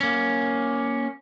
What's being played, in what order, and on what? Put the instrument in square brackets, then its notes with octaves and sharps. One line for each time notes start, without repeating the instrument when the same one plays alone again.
[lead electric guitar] A#3 C#4